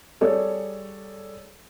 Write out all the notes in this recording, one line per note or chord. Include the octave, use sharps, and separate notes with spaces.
G3 G#4 A4 C#5 D5